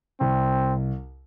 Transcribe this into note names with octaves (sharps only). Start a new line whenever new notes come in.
C2 C4